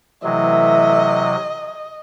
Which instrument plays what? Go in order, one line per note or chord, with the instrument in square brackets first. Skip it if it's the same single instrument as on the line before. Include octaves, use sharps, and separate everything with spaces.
[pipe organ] C3 F#3 [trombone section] E3 A3 [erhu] D#5 [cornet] E5